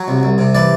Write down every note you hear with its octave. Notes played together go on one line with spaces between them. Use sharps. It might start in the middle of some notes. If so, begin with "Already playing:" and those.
Already playing: F#3
C2
C2
C3
E3 D5